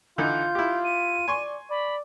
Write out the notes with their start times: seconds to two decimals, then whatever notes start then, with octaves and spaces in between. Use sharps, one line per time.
0.18 D3 E3 D#4 F4 G6
0.55 E4 G4
0.84 D#7
1.28 D5 G#5 C6 C#6
1.70 D5 B5